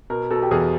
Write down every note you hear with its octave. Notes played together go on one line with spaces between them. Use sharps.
B2 A#4
B2 A4
G4
E2 G#4